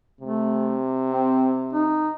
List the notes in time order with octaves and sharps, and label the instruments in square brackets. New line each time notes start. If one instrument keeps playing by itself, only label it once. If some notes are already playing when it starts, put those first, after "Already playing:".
[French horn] C3 [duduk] A3
[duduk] C4
D#4